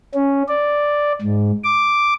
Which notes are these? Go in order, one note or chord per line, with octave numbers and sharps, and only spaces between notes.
C#4
D5
G#2
D6